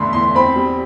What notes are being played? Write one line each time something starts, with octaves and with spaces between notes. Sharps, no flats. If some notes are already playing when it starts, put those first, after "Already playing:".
Already playing: E2 D3 A3 B5 C6
E2 C6
C4 B5
G3